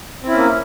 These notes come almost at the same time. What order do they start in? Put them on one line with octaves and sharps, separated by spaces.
C4 E4 C#4 A#3